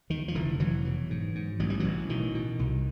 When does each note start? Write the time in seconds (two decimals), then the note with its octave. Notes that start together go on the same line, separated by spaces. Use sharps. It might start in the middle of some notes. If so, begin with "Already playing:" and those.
0.10 E2 D#3
0.28 F3
0.34 F1 D3 E3
0.60 F1 E3 F#3
0.85 B2
1.10 G#2
1.35 G#2
1.59 A1 F#3
1.70 G3
1.80 A1 E3 F#3
2.09 B2 D#3
2.35 B2
2.59 C2